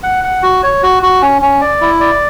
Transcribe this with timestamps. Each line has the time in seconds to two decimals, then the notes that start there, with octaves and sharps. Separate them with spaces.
0.03 F#5
0.24 F#5
0.43 F#4
0.63 C#5
0.83 F#4
1.03 F#4
1.22 C#4
1.42 C#4
1.61 D5
1.81 E4
2.01 D5